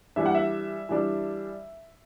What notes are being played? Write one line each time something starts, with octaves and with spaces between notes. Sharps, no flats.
E3 G3 D4 E5
F#5
E5
E3 G3 D4